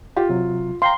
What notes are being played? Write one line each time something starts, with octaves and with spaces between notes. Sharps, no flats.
F4 G4
C3 F#3
F5 G5 A#5 C6